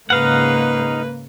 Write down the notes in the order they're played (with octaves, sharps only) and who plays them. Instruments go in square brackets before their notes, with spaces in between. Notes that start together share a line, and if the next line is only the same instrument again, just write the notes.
[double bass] G#2 C#3 [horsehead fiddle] A#3 [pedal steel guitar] D#4 F5 F#5 [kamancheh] B4